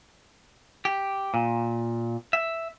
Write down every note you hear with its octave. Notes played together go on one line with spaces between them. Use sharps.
G4
A#2
E5